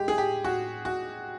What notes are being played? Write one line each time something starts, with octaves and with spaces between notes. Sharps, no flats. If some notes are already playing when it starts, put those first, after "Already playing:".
Already playing: G#3 G4
G#4
G4
F#4
F#4